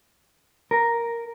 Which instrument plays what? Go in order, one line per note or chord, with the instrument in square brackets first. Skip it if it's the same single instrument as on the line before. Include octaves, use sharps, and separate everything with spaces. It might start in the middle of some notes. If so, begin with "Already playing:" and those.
[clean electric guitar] A#4